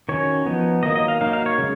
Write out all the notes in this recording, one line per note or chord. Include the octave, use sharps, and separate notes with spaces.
D#3 F#3 C#4 C#5
F3 B3 D#4
D#3 F#3 A#3 D#5
D#5
F5
F#3 A#3 D#4 F5
F5
C#5
C#3 G#3